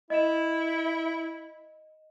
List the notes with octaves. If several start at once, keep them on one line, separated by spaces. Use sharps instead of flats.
E4 D#5 E7